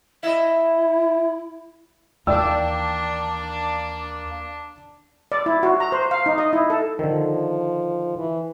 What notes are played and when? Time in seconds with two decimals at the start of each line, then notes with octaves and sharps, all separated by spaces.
0.23 E4 D#5 E5
2.27 D#2 E3 A#3 D4 D5 G5 E6
5.32 D5
5.46 E4
5.63 F#4
5.80 A#5
5.92 C5
6.11 F5
6.26 D#4
6.38 D#5
6.53 E4
6.70 A4
6.99 D3 D#3 F3
8.18 E3